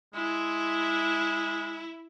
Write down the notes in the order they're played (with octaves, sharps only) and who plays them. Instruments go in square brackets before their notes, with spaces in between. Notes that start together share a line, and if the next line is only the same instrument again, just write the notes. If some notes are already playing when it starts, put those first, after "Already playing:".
[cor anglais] G#3 [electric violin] E4